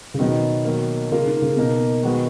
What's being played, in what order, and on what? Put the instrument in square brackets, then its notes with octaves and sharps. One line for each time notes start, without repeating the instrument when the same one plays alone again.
[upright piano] C#3
[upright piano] B2 [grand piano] D#3 F#3 B3 D#4
[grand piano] D#3 F#3 A#3
[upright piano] C#3 [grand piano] A#3 F4 A#4
[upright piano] D#3
C#3
[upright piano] B2 [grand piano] A#3 D#4 A#4
[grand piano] D#3 G#3 B3 F#4 B4